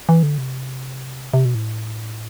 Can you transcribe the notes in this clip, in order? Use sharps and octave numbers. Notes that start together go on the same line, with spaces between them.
E3
D3
C3
C3
B2
A2